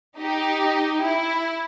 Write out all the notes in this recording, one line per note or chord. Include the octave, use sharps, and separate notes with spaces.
D#4 G4
E4